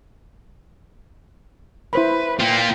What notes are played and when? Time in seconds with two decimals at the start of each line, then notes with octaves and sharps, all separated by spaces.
1.93 E4 B4 C5 B5
2.39 A#3 F4 G5